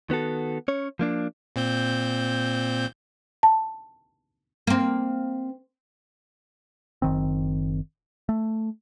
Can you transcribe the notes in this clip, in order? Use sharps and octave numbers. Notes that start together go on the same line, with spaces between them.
D#3 B3 F#4 A4
C#4 C#5
F3 A#3 D4
A#2 C4 G6
A5
A#3 C4
F#1 D#3 C4
A3